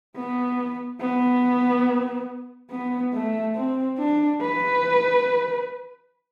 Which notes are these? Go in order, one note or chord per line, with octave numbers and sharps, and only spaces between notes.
B3
B3
B3
A3
C4
D4
B4